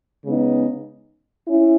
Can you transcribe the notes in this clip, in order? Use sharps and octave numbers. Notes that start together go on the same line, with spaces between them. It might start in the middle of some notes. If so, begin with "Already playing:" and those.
C#3 G#3 B3 D#4
C#4 E4